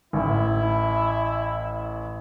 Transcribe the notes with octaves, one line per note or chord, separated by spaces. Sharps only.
A1 E4